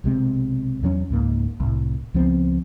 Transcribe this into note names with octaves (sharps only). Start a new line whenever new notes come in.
B1 C3 G#3 C4
E2 G2 F#3 C#4
C#2 G#2 A#3
C2 A2
C#2 F3 B3 C4